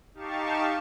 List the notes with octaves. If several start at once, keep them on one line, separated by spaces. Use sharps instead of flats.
D#4 G4 F5 A5 C#6